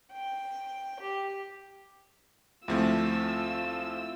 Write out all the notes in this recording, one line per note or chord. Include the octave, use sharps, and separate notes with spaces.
G5
G4
D2 F3 A3 C4 E4 F4 E6